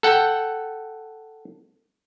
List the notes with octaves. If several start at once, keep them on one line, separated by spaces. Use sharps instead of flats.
A4 F#5 G5